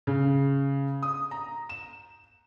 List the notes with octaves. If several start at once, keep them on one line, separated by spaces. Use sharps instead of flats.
C#3
D#6
A#5
E7